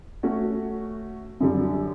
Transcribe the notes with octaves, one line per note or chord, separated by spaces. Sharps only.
A3 C#4 F#4
F#2 D3 G3